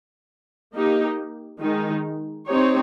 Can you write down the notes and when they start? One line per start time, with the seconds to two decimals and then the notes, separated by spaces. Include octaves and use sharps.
0.74 A#3 D#4 G4
1.60 D#3 G#3 D#4
2.47 C4 D#4 G4 C#5